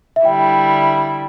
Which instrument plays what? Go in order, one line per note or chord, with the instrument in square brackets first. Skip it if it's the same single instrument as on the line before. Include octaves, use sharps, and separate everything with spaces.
[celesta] E5
[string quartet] D3 G3 E4 [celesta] G5